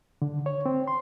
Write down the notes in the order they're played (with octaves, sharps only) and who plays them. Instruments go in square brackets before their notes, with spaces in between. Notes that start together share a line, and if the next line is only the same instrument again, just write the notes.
[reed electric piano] D3
C#5
C4
C6